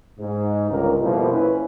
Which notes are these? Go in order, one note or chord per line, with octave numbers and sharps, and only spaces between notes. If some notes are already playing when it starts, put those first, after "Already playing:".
G#2
G1 C#2 A#4
F2 B2 F3 G3 A#3 E4
C#4 E4 B4